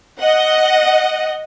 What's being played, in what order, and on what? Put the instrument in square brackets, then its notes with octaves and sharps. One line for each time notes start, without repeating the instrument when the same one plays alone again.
[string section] D#5 F#5